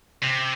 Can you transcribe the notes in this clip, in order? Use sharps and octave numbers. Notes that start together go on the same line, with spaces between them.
C3